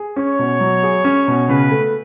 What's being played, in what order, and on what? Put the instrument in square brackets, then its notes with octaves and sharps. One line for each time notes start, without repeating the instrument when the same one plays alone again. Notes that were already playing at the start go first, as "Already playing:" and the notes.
Already playing: [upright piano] G#4
[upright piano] C#4 [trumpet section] C#5
[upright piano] B2
F#3
G#4
C#4
B2
[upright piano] C#3 [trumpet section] B4
[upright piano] A3